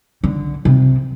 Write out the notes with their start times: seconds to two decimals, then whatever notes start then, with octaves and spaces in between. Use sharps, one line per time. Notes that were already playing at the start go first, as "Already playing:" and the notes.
0.24 D3
0.65 C3